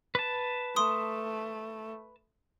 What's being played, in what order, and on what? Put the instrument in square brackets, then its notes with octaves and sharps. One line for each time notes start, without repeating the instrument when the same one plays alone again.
[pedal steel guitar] B4 A5
[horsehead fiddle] A3 [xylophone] C6 D#6